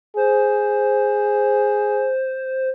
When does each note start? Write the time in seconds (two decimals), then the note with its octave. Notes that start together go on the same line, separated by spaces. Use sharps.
0.17 G#4 C5